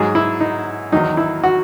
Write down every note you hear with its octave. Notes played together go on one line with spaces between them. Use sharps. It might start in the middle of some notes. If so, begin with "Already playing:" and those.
Already playing: G#2 F#3 G#4
E4
D#4
E2 D#3 F#3 D#4
E4
F#4